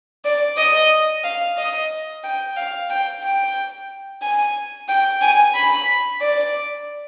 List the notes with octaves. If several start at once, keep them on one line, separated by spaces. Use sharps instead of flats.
D5
D#5
F5
D#5
G5
F5
G5
G5
G#5
G5
G#5
B5
D5